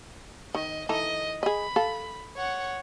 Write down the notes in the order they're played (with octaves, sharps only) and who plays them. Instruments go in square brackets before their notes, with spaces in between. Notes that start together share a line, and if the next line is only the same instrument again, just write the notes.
[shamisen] D#3 [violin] D#5
[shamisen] E3 D#4 A4 [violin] D#5
[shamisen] G#4 D#5 [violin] B5
[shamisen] A4 F5
[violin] C#5 F#5